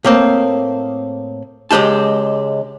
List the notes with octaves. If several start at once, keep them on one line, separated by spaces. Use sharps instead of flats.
A2 A#3 C4
C#2 F#3 G#3 G4 A5